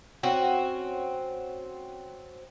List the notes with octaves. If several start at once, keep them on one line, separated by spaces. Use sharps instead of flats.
C4 C#4 F#4